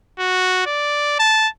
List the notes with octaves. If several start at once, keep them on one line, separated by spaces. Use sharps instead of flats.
F#4
D5
A5